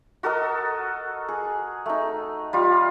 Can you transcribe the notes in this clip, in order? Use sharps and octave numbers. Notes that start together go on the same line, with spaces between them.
F#4 A4 A#4 D#5
G#4
A3 D#4
G3 F4